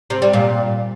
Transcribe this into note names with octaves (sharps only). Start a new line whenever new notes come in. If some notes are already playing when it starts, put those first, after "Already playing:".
C3
G3
A#2